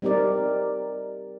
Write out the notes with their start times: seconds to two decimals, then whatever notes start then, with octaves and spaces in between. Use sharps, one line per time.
0.02 G3 C4 D#4 G4 A#4 D5